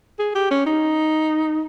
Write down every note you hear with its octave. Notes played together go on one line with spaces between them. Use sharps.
G#4
G4
C#4
D#4